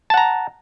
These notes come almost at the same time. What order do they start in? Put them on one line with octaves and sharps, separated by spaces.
A5 F#5 A#5